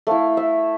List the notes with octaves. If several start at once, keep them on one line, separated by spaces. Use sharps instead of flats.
A3 E4 F5
E5